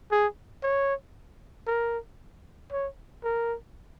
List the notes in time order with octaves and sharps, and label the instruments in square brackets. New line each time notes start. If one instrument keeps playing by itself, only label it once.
[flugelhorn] G#4
C#5
A#4
C#5
A#4